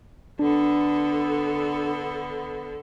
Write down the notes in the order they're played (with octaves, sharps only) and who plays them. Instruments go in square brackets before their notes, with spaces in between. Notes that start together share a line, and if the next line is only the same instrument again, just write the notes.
[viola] D3 A4 [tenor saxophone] B3 [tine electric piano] D4